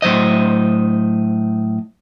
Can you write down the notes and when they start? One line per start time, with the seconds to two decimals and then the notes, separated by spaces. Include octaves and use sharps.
0.02 A2 F#3 C5 D#5